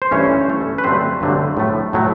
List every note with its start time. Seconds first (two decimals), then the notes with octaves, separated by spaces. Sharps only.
0.02 C5
0.11 G2 E3 A3 C#4 C#5
0.48 G2 E3 A3
0.78 B4
0.84 G2 D3 F#3 A3 C4 C5
1.21 G2 D3 F#3 A3
1.57 A2 F#3 A3
1.93 A2 F#3 A3